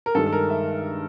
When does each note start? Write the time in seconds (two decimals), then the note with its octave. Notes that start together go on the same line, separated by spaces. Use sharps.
0.06 A#4
0.15 G2 D#3 G#3 A4
0.26 A4
0.32 A#4
0.50 E5